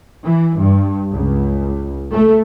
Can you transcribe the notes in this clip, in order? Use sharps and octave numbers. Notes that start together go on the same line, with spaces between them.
E3
G2
C#2
A3